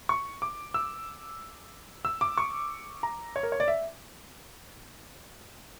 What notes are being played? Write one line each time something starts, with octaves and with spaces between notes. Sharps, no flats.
C#6
D6
E6
E6
D6
C#6
A#5
C#5
A#4
C#5
D5
E5